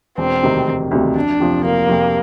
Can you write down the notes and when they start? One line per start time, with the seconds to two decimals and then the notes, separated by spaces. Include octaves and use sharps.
0.18 E1 C4
0.42 D2 C3 D#3
0.67 E1
0.91 D2 C3 D#3
1.15 F1 D4
1.40 F2 C3 F3
1.65 F1 A#3
1.88 F2 C3 F3